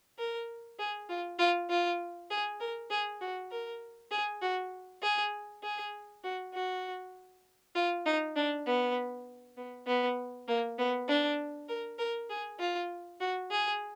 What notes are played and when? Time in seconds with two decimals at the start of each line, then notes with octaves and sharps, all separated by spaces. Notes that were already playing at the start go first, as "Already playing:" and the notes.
0.19 A#4
0.79 G#4
1.09 F4
1.39 F4
1.70 F4
2.30 G#4
2.60 A#4
2.90 G#4
3.21 F#4
3.51 A#4
4.11 G#4
4.42 F#4
5.02 G#4
5.63 G#4
6.24 F#4
6.54 F#4
7.75 F4
8.06 D#4
8.36 D4
8.66 B3
9.57 B3
9.87 B3
10.48 A#3
10.78 B3
11.08 D4
11.69 A#4
11.99 A#4
12.30 G#4
12.60 F4
13.20 F#4
13.51 G#4